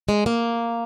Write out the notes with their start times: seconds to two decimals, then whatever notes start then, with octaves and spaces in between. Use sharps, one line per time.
0.09 G#3
0.26 A#3